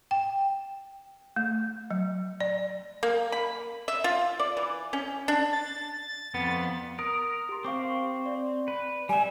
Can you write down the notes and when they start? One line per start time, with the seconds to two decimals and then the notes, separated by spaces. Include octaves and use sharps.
0.11 G5
1.36 A3
1.91 F#3
2.40 D5
3.03 A#3
3.32 B5
3.88 E5
4.04 F4
4.40 D5
4.57 E3
4.93 C#4
5.28 D4
5.53 A6
6.34 F2 B3
6.99 A#4 D#6
7.49 G4 C6
7.65 C4 F5 C#6 D6
8.26 D5
8.68 B4
9.09 G3 D5 E5 G5 G#5